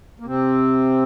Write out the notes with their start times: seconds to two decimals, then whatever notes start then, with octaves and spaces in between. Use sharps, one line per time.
0.20 A#3
0.26 C3 C4